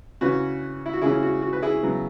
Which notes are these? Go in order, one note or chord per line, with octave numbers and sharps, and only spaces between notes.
C#3 E3 C#4 F#4 B4
E4
F#4
C#3 E3 C#4 E4 G#4
F#4
F#4
B4
E4 G#4
C#3 F#3 B3